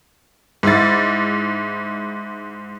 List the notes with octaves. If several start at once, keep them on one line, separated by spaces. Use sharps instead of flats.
G#2 E4 A6